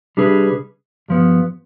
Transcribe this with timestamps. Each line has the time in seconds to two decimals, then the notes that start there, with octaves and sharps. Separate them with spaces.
0.17 C3 G3 D4 G#4 B4
1.09 G2 F3 B3